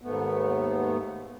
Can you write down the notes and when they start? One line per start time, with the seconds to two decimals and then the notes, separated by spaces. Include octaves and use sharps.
0.01 D#2 G#2 A3 B3